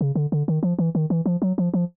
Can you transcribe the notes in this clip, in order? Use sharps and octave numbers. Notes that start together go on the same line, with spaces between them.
C#3
D3
D3
D#3
F3
E3
D#3
E3
F3
F#3
F3
F3